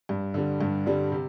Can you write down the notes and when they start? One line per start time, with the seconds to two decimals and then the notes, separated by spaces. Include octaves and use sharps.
0.09 G2
0.34 D3 G3
0.61 G2
0.86 D3 G3
1.12 C3